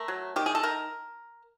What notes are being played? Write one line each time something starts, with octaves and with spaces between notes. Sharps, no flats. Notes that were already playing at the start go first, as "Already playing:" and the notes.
Already playing: A3 A#4
F#3
D#3 G4
G#4
A4
D#3 A#4